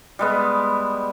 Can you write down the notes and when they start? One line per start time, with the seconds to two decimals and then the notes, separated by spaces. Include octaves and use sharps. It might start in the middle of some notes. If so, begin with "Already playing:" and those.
0.19 G3 G#3 B3